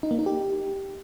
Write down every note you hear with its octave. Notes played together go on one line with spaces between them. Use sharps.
D#4
A#3
D#4
G4